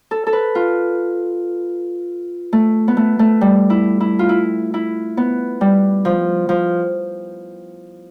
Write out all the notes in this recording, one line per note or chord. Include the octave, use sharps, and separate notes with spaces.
A4
A4
B4
F4
A3
B3
A3
A3
G3
E4
E4
F4
E4
E4
B3
G3
F3
F3